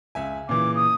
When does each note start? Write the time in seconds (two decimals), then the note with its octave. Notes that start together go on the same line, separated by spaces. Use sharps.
0.15 C#2 E5 G#5
0.49 A#2 C#3 E3 D6
0.75 D#6